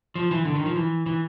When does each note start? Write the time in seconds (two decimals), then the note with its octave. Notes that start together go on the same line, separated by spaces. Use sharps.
0.15 F3
0.31 E3
0.45 D3
0.55 D#3
0.66 F3
0.76 E3
1.06 E3